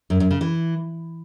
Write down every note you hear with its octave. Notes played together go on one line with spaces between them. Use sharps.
F#2
F#2
C#3
E3